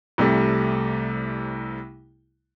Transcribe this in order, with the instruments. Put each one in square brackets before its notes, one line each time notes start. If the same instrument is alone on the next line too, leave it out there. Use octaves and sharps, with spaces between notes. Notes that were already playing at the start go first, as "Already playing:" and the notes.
[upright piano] C2 C3 G3 A3